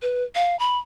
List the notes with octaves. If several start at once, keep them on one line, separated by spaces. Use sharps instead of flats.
B4
F5
B5